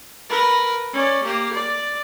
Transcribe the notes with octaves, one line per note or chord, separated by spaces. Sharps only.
A#4 B4
C#4 D5
A#3 G4
D5